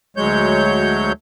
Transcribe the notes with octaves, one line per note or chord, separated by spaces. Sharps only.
D2 F#3 G#3 C#5 G6